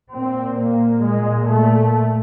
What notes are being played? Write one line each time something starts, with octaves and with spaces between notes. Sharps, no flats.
A#2 C4
A#3
A#2 G#3
A3